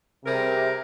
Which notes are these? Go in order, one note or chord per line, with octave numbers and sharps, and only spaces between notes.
C3 G3 G#4 A#4